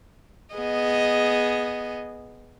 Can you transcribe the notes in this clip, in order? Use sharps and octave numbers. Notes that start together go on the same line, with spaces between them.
B3 G#4 D#5